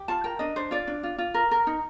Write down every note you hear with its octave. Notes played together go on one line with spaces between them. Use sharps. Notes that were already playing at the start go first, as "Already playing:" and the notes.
Already playing: G4
F4 A5
A#4 G5
D4 D#5
D4 C5
F4 D5
D4
F4
F4
A#4
A#4
D#4